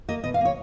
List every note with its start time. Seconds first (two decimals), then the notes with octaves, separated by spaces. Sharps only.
0.08 A#3 D#5
0.24 B2 D#5
0.34 F5
0.41 A#3 C#5